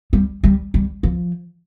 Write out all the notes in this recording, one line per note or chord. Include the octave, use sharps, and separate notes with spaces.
G3
G3
G3
F3